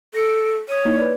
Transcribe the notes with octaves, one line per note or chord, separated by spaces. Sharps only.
A4 A#6 C#7 D7
C#5 D#6 D#7
A#3 D#4 E4
B4 D5